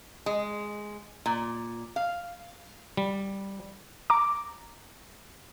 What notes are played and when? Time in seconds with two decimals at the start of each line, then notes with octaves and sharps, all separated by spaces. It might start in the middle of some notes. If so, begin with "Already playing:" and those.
0.26 G#3
1.26 A#2
1.96 F5
2.97 G3
4.10 A#5 D6